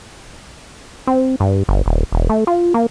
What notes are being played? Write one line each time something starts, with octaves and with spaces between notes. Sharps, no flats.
C4
G2
G1
D#1
E1
A3
F4
A#3